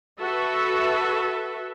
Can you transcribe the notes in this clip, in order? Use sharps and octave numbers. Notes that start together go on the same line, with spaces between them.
F#4 A4 B4 E5